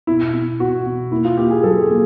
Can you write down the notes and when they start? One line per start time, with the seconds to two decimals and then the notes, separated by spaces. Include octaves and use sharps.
0.07 B2 E4
0.33 B2
0.59 B2 F#4
0.85 B2
1.11 A#3 E4
1.25 F4
1.37 A#3 G4
1.51 G#4
1.63 F#3 A4
1.81 G#4
1.89 A#3